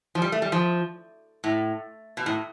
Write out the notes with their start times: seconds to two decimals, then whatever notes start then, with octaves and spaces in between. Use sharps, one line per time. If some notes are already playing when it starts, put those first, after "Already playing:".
0.15 F3
0.22 G3
0.32 A3
0.42 G3
0.52 F3
1.44 A2
2.17 B2
2.26 A2